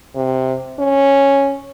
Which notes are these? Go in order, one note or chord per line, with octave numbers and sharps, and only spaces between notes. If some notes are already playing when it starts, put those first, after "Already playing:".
C3
C#4